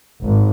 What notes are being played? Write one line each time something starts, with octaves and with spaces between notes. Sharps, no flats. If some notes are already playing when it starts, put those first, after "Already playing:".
G#1